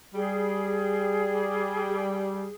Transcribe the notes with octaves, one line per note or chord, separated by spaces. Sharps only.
G3 G#4